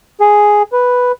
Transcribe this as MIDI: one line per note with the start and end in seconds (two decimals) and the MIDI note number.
0.20 0.62 68
0.72 1.12 71